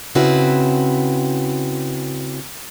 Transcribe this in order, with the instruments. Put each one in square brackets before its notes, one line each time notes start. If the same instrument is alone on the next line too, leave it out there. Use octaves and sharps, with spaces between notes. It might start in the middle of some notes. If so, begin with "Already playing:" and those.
[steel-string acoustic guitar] C#3 C4 E4 F#4 B4